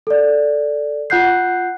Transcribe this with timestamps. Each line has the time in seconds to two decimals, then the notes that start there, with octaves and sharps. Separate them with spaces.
0.07 A4 D5
1.10 F4 F#5 F#6 G6 C7